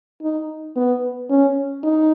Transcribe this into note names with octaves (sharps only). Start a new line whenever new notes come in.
D#4
B3
C#4
D#4